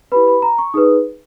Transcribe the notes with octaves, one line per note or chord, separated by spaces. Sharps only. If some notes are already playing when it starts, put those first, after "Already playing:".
E4 G4 B4 B5
B5
A#5
C#6
D#4 G#4 B4 D#6